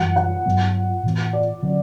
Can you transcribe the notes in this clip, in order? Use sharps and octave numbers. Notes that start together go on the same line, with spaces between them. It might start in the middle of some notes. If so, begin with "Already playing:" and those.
Already playing: F#2 E3 G3 F#5
F#5
G2 F#3 B3
A2 E3 B3
D5
D3 F#3 C#4